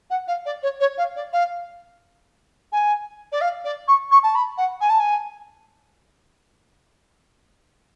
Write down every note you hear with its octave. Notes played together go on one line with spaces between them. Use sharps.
F#5
F5
D5
C#5
C#5
F5
D5
F5
G#5
D5
F5
D5
C#6
C#6
A5
B5
F#5
G#5
A5
G#5